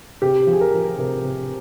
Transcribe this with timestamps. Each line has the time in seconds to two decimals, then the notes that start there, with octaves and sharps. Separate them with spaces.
0.22 C3 G4
0.47 F3
0.53 G#4
0.61 A#4
0.74 F3
0.98 C3 A#4
1.25 C3